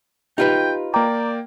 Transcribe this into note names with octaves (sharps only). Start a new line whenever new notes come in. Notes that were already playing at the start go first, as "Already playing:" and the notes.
D#4 F4 G4 B4 G5
A#3 D5 G5 A#5 D6